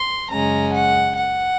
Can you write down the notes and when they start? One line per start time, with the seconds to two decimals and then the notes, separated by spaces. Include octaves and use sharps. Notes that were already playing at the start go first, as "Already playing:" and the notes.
Already playing: C6
0.30 F#2 C#3 G#3 C#4 A#5
0.73 F#5
1.17 F#5